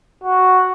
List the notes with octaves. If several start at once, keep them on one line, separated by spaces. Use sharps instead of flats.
F#4